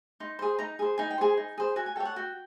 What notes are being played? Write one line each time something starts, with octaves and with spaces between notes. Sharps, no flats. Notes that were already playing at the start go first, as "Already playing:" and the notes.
D#4 C6
G#4 C5
D#4 A#5
G#4 C5
D#4 G#5
G5
G#4 C5 G#5
D#4
G#4 C5
F#4 G#5
G#5
A4 C#5 G5
F#5
F#4 G5